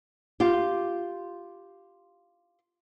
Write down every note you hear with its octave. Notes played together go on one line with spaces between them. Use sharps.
F4 G4